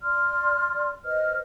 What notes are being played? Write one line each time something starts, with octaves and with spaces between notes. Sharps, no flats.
D5 C6 F6
B4 C5 D#5 F6